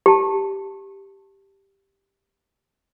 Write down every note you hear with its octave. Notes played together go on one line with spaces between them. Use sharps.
G4 A5